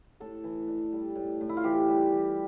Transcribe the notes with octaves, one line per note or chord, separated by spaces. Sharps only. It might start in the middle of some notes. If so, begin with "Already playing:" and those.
A2 A4
E3
D4
G3
A2
A2
E4
F4
E3 G4
G3
E3